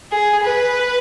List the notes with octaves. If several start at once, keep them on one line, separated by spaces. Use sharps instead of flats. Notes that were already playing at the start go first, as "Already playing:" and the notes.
G#4
B4